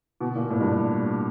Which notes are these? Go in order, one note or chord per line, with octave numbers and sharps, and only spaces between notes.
B2
A#2
A2
G2